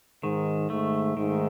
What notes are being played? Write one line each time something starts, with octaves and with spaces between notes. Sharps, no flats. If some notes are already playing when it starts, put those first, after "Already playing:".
G#2 D#3
G#2 A3
G#2 D#3